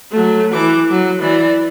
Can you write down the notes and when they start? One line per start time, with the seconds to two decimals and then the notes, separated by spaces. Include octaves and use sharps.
0.11 F#3 A3
0.53 E3 D6
0.91 F#3
1.21 E3 D5